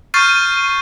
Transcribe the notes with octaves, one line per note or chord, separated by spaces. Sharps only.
C#6 F6 G6 A6 C7 D#7